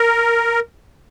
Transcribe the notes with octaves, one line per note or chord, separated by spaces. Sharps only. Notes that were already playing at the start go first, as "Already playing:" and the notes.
Already playing: A#4